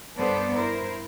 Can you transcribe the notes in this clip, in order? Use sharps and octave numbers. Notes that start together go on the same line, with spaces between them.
G2 B3 A4 B4 C5 D5
E4 A#4 C5